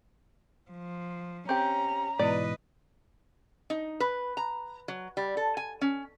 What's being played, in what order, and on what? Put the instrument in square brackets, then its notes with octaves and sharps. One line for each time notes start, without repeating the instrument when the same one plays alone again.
[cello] F3
[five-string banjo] C4 G4 [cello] C#4 [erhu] A#5
[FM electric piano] G#2 B2 E3 [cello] B4 D#5 [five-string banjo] D5
[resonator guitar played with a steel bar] D#4
B4
A#5
F#3
G3
A4
G#5
C#4